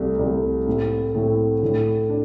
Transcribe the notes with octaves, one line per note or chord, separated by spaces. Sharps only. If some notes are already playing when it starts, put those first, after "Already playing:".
Already playing: C2 C3 A3
C2 C3 A3
A2 A3 C4 E4
A2 A3 C4 E4
A2 A3 D4
D4